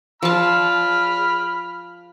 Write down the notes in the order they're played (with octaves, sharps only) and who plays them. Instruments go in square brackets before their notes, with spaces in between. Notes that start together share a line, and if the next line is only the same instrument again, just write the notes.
[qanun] F3 A5 [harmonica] B5 F6